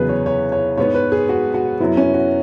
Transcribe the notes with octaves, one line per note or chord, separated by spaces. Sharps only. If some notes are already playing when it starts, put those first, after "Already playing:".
Already playing: E2 C#3 F#3 B3 G#4 B4
C#5
C#5
C#5
G#2 G#3 B3 C#5
B4
G#4
F#4
F#4
F#2 F#3 B3 E4
C#4
F#4